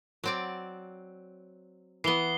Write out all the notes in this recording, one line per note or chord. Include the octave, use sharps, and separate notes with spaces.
F#3 C4 D5
E3 B3 C7 G7